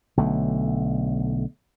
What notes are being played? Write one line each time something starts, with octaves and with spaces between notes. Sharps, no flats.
B1 D3 A3